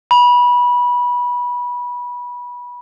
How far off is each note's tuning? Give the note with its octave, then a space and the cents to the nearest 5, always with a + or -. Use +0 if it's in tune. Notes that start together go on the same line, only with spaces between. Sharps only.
B5 -20